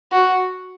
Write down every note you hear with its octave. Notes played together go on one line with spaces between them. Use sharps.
F#4